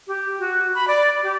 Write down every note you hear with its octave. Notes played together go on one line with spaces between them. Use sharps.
G4
F#4
B5
D5
G4